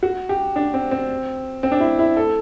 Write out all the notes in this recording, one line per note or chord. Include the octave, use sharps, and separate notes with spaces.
F#4
G4
D4
C4
C4
C4
D4
E4
E4
A4